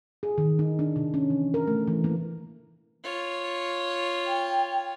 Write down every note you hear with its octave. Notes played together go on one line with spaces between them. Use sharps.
G#4
D#3
D#4
D4
C3
C#4
E3
A#4
A3
E3
A#3
F4 C#5
G5